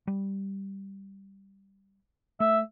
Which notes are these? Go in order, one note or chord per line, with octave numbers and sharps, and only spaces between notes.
G3
A3 E5